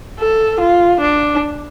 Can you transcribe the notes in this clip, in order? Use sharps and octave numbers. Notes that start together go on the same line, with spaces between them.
A4
F4
D4